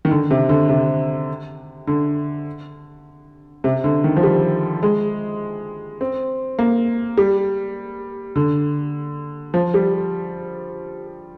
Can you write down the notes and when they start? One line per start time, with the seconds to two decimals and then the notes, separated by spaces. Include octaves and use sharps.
0.05 D#3
0.11 D3
0.31 C3
0.49 D3
0.69 C3
1.87 D3
3.64 C3
3.84 D3
4.04 D#3
4.16 F3
4.23 G3
4.83 G#3
6.01 C4
6.59 A#3
7.18 G3
8.36 D3
9.54 F3
9.74 G3